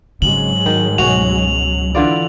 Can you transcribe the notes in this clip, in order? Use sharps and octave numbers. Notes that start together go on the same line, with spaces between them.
G#1 G#2 C#3 F#3 G#3 F#7
D#3 G3
C#2 B2 C#4 F#4 F7
D3 E3 F4 D5